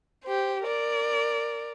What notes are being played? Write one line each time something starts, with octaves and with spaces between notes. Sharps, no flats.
G4 C5
A#4 D5